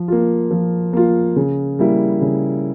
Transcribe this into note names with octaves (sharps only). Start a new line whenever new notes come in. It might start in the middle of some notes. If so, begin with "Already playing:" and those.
Already playing: F3
A#3 F4
F3
A#3 F4
C#3
G3 A#3 E4
C#3